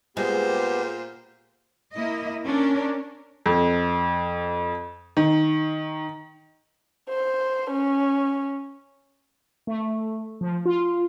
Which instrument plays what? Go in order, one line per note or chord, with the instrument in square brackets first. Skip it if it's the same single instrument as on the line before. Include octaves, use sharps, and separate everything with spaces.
[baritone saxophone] A#2 [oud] G#3 [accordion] B3 G4 [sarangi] C5
[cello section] A#3 E4 D#5
C#4 D4 A#4
[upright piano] F2
D#3
[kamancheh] C5
C#4
[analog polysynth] A3
F3
F4